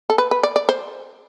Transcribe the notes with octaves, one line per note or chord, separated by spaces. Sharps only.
A4
B4
B4
D5
D5
C5